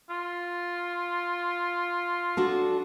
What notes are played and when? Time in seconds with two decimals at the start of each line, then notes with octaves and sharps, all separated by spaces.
0.10 F4
2.37 D4 F#4 A4